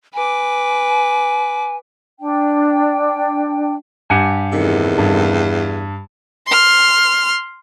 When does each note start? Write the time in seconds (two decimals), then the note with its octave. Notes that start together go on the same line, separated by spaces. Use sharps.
0.14 B4 G#5 D6
2.20 D4 G5
4.10 G2 G4 F#5 G#5
4.53 E2 A2 C3 D#3
4.98 G2
6.47 C6 F6